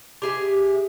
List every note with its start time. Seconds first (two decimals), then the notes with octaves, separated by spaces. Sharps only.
0.22 G4 G#4 E5